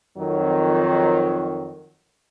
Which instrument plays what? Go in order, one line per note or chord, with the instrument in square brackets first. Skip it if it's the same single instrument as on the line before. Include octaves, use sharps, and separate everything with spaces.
[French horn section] F2 D#3 F#3